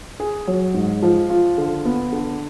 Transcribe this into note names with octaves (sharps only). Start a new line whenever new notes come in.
G#4
F#3
G#2
F3
F4
D3
B3
D3